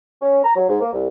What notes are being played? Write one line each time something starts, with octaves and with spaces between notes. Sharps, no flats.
C#4
A#5
F#3
G#2
A#3
C2